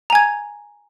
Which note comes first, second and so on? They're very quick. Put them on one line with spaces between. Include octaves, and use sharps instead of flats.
A#5 G#5 G#6